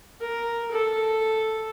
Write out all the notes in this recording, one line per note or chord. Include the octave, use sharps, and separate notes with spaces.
A#4
A4